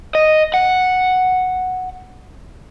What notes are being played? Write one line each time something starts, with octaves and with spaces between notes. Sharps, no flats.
D#5
F#5